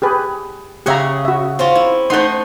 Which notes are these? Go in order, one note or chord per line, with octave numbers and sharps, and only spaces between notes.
G4 G#4 B4
C#3 G4 G#4 E5 F#5 A#5
F#4 E5
C4 C#4 F4
E4
A3 D#4 C5 F#5 C6